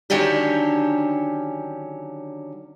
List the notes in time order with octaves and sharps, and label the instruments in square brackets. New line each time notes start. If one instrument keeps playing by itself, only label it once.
[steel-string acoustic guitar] D3 D#3 F#3 C#4 D4 G4